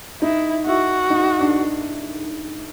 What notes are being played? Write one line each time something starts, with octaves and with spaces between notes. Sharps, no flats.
D#4 E4
E4 F#4
D#4
D4